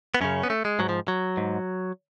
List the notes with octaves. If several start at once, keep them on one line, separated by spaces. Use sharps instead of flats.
B3
F#2 C#3 C#4
B3
A3
G#3
G#2 F#3
F3
F#3
G#2